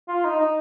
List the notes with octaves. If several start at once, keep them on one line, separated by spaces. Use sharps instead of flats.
F4
D#4
D#4